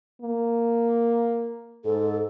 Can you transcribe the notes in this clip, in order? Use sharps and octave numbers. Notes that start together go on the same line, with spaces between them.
A#3
G#2 A4